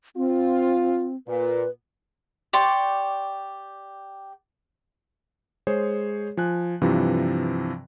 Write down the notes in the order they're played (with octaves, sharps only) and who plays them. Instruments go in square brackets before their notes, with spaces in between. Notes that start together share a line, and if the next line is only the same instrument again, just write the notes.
[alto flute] C4 [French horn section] F4
[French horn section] A#2 [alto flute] B4
[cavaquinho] G4 D5 C6 C#6
[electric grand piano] G#3 G#4 C5 C#5
F3 G#5 F#6
G2 C3 E3 F3